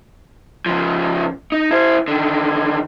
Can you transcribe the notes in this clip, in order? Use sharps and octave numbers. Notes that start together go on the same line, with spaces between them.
C#3 F3
D#4
E4 C5
D3 D#3